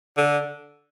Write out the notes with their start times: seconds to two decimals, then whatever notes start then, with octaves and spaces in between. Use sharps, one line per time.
0.17 D3